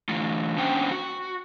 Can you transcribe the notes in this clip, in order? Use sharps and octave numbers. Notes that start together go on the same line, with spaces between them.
D3 E3 A3 F4
C#4 D4 F#4 C5 F#5 G5
F#4